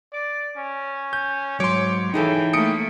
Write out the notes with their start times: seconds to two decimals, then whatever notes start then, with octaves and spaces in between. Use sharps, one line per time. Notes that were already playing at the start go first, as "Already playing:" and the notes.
0.13 D5
0.56 C#4
1.13 G6
1.60 G#2 F#3 C#5 C6 D6
2.14 E3 D#4 G#4 A4 G5
2.53 A3 A#3 D#6 C#7 D7